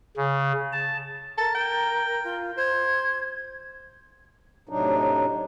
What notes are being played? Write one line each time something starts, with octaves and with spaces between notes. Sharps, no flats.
C#3
A5
A#4 A5
G5
F4
C5 G#6
A2 C3 F#3 D4 D#4